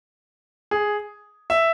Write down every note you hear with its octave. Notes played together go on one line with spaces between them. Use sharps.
G#4
E5